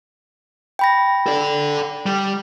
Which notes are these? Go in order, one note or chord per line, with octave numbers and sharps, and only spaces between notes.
G5 B5 A#6
A4 D5
G3